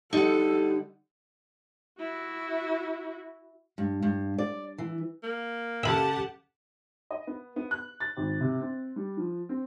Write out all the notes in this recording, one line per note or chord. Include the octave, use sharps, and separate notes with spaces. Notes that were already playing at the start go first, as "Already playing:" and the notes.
D3 G3 D#4 A4 F#5
E4 F#4
G2
G2
D5
E3
A#3
C#3 G4 A4 E5 F#5 A5 B5
D#5
B3
B3
F#6
A6
G#1
C3
C4
G3
F3
C4